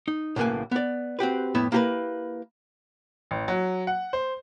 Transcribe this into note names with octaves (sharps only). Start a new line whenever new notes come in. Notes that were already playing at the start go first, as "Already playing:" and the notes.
D#4
B1 A2 C#3 A#3 B4 G#5
B3 D5
C4 F#4 G4 B4
F2 A2 B3 E4 E5
A#3 E4 G4 G#4 A#4 B4
A1
F#3
F#5
C5